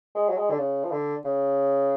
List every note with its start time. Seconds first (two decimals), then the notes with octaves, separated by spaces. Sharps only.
0.15 G#3
0.29 F#3
0.38 G#3
0.50 D3
0.59 C#3
0.84 F3
0.91 D3
1.25 C#3